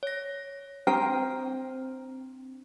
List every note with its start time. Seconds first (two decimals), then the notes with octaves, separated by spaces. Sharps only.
0.03 C#5 A#6
0.87 C4 D4 C5 G5 A#5 F6